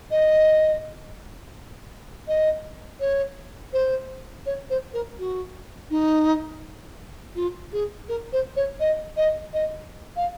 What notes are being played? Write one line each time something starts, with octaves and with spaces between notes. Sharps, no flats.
D#5
D#5
C#5
C5
C#5
C5
A#4
F#4
D#4
F4
G#4
A#4
C5
C#5
D#5
D#5
D#5
F5